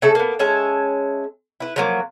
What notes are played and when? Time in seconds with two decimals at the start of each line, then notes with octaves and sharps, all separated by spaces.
0.02 C#3 A3 A4 E5
0.15 A#3 B3
0.39 G#3 C#4 E5 A5
1.60 E4 B4
1.76 F3 F#3 A#3